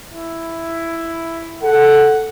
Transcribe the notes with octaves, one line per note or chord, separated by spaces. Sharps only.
E4
A4 F#5